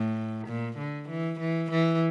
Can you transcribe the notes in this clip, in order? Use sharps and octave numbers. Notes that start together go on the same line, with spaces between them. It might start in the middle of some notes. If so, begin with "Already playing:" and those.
Already playing: A2
A#2
D3
E3
E3
E3